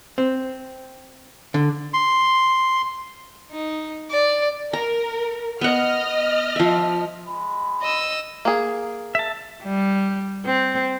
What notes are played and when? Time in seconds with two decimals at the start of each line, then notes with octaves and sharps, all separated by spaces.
0.18 C4
1.54 D3
1.94 C6
3.52 D#4
4.11 D5
4.73 A#4 A#5
5.61 B3 D#5 F#5 F6
6.56 F3 E5
7.26 G#3 B5
7.82 D#5 E6
8.45 A#3 G#4
9.15 E5 A5
9.64 G3
10.45 C4